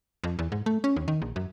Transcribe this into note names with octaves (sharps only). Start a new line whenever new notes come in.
F2
E2
G#2
A3
C#4
D#2
D#3
A#1
F#2